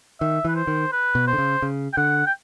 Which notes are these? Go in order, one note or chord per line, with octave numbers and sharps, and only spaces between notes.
D#3 E5
E3 B4
C5
D#3
B4
B2
C5
D3
C#3
C#3
G5
D3 F#5
G5